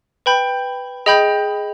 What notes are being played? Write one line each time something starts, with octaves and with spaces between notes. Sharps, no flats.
B4 G5 B5 G6
G#4 D#5 G5 B5 G6